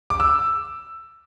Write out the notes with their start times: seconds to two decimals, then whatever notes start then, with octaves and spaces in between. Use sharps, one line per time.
0.10 D6
0.20 E6